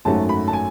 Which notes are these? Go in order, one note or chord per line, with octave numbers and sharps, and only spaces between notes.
G#1 F#2 D#3 F#3 A3 A5
B5
A5
G#5